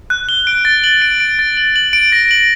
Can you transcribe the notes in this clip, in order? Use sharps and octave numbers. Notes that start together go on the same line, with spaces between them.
F#6
G7
D7
A6
F#7
D7
D7
A6
F#7
F#7
D7
A#6
F#7